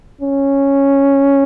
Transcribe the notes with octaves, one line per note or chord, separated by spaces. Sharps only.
C#4